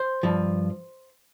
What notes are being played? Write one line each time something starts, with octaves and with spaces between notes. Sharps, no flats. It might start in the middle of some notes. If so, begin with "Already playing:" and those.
Already playing: C5
G2 F3